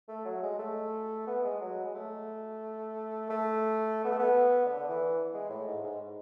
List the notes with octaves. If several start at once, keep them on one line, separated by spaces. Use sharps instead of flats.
A3
F#3
G#3
A3
B3
G#3
F#3
G#3
A3
A3
B3
A3
B3
D3
D3
E3
G#3
A2
G#2
G#2